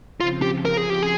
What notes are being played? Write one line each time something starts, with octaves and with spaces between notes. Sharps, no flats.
C#3 F3 C4 F4
G4
A#4
G#4
G4
G#4